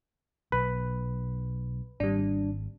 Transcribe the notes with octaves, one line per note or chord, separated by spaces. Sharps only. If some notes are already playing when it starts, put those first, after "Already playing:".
B1 B4
G#1 G3 D4